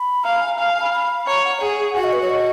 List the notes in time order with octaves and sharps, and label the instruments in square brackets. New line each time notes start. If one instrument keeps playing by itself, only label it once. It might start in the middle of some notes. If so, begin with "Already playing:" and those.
Already playing: [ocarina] B5
[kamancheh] F5 [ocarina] A#5
[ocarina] G#5
[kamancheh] F5 [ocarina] G#5
[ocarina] A#5
G#5
B5
B5
[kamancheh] C#5 [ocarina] A#5
[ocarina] F#5
[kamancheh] G#4
[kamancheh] F#4 [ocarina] F#5
[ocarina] D#5
B4
C#5
D#5